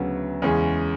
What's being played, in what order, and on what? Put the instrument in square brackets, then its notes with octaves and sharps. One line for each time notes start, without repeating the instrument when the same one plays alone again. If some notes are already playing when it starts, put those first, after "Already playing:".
Already playing: [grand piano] D2 C#3 F#3 B3
E2 C#3 G#3 C#4 G#4